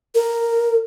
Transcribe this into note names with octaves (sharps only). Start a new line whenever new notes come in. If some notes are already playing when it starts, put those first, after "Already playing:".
A#4